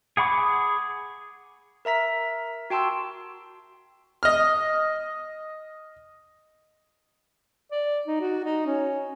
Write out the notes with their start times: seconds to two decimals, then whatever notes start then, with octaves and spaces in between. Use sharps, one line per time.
0.17 G#4 F#5 B5 C#6 D6
1.85 A#4 E5 A#5 B6
2.70 F#4 G5 A5 C6 E6
4.23 D#5 F6
7.72 D5
8.08 D#4
8.21 F#4
8.44 D#4
8.66 C#4